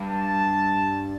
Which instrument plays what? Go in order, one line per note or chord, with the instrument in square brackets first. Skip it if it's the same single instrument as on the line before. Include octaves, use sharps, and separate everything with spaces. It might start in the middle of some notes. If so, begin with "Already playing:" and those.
Already playing: [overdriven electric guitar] G2
[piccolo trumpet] A5